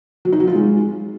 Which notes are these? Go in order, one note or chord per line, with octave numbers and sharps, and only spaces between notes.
F#3
D#4
F#3
F4
G#3